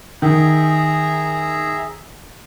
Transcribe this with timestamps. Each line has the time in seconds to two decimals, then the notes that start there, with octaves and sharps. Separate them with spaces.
0.22 D#3 G#4 E5 A#5